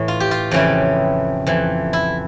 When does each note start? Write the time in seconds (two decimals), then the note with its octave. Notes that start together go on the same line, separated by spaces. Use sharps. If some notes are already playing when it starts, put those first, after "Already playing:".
Already playing: A2 E3
0.08 F4
0.20 G4
0.31 F4
0.51 F2 C#3 E3 E4
1.47 F2 E3
1.93 E4